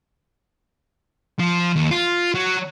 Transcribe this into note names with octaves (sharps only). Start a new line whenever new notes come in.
F3
D#2
F4
F#3